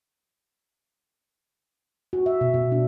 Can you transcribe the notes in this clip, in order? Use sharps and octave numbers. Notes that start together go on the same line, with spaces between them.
F#4
E5
B2
B2
D4